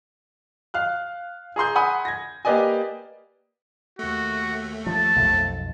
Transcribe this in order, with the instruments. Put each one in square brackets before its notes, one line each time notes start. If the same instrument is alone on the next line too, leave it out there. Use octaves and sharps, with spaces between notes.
[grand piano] F5 F6 F#6
G#4 A#5 C6 G6
F#5 G#5 B5 C6 D#6
G#6 A#6
A#3 G4 B4 D5 D#5 G#5
[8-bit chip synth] D#2 A3 [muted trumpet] F#4
[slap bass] F3 [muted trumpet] A5
[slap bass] B1 F2